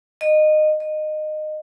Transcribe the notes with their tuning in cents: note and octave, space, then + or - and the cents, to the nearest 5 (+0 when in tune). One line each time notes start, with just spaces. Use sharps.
D#5 -20
D#5 -20